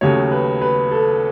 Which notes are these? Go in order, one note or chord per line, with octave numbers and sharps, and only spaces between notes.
D#2 C#3 F#3 A3 C#5
B4
B4
A4